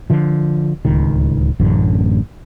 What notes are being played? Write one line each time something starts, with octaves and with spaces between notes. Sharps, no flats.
D3 F3
D1 C#2 D#3
A1 F#2 D3